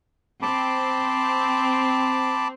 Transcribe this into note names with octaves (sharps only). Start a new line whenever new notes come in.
C4 A5 B5 D6